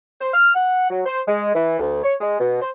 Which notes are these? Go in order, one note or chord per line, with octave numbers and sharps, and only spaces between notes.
C5
F6
F#5
F#3
C5
G#3
E3
D2
C#5
G#3
B2
C5